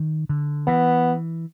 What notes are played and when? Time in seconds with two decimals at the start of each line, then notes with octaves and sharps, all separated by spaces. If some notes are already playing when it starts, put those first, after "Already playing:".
Already playing: D#3
0.29 D3
0.67 E3 B3